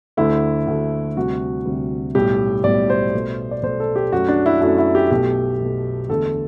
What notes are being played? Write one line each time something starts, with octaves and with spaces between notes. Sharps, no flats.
D2 D3 A3 E4
D2 D3 A3
D2 C3 G3 F#4
D2 C3 G3
B1 A2 G3 G4
B1 A2 G3 D5
C5
B1 B2 A3
D5
B1 B2 A3 C5
A4
G4
F#2 F#3 A3 F#4
D4
E4
F#2 F#3 A3 E4
E4
G4
B1 B2 A3 G4
B1 B2 A3
E1 E2 D3 A3 A4